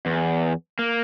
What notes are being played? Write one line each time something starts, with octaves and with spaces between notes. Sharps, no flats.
E2
A#3